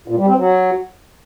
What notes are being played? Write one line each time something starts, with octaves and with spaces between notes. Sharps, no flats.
A#2
G3
C4
F#3